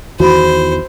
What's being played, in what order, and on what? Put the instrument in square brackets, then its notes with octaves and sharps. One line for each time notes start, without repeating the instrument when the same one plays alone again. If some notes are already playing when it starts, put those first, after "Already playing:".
[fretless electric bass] E2 D#3 E3 [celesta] F#4 B5 [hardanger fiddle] C5